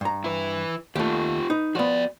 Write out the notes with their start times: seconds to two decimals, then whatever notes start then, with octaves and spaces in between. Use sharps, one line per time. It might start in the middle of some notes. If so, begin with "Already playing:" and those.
0.01 G2 A#5
0.24 E4 B4
0.96 D#2 A3 F4 G4
1.50 D#4 B4
1.75 F3 B3 F#4 C#5 D5